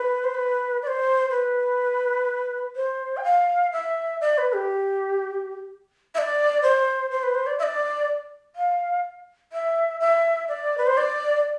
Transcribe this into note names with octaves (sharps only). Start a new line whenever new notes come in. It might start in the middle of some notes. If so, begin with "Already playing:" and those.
Already playing: B4
C5
B4
D5
C5
B4
C5
G5
F5
E5
D5
B4
G4
E5
D5
C5
C5
B4
C5
D5
E5
D5
F5
E5
E5
D5
B4
C5
D5